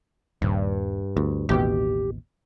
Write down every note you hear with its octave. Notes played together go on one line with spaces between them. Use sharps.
D#1 G2
D2
A1 D#2 B2 G4